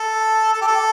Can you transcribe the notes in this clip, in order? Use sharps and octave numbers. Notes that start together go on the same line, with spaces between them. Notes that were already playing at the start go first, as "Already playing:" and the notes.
Already playing: A4
A4
G4
A4